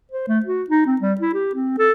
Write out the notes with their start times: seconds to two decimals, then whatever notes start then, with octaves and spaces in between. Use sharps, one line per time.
0.12 C5
0.28 A3
0.45 F#4
0.70 D#4
0.86 C4
1.01 G3
1.21 E4
1.34 G4
1.55 C4
1.79 A4